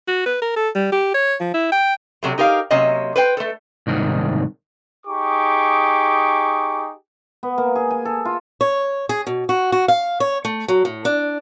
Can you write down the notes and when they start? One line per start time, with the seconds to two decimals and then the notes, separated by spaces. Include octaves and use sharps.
0.08 F#4
0.26 B4
0.42 A#4
0.56 A4
0.75 G3
0.92 G4
1.14 C#5
1.40 F3
1.54 E4
1.72 G5
2.23 C3 F#3 A3
2.38 D#4 G4 A#4 C#5 F5
2.71 C3 F#3 A#3 C#4 D#5
3.16 B4 C5 G5
3.37 A3 A4
3.87 C2 G#2 D#3
5.06 D#4 G4 G#4 C#6 D6
7.43 B3
7.58 A#3
7.75 G#4
7.91 G#5
8.05 A4
8.25 F4
8.61 C#5
9.09 G#4
9.27 B2
9.49 F#4
9.72 F#4
9.88 F5
10.20 C#5
10.45 A3
10.68 F#3
10.85 A2
11.05 D4